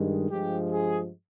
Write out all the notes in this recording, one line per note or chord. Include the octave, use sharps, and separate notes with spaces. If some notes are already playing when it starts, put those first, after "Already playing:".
Already playing: G2 D#3 G#3
G2 F3 G#3 G4
G#4